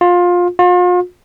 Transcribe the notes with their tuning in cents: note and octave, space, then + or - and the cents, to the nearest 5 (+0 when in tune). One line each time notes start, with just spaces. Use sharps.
F4 +20
F4 +40